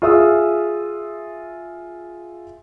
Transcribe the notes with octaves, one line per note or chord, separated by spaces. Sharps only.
F4 G#4 E5 D#6 E6